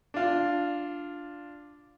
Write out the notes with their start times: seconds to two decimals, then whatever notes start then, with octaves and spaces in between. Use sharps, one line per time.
0.14 D4 F4